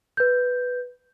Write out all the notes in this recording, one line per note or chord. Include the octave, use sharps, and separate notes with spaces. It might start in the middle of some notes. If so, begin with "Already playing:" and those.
B4 G6